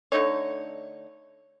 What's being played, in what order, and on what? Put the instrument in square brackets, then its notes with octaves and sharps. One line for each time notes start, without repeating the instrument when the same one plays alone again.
[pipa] D3 A3 D#4 C#5